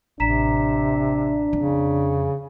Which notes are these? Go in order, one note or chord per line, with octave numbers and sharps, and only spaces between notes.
A1 C3 D4 A#5 B6 E7
F2 C#3 C4